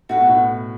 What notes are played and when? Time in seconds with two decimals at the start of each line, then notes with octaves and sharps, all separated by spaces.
0.09 A2 F#4 B4 F#5
0.20 B2
0.29 A2